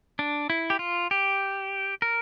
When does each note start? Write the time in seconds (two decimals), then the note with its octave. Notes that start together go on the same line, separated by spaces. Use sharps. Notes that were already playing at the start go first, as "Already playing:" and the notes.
0.19 D4
0.50 E4
0.70 G4
0.79 F4
1.11 G4
2.02 A#4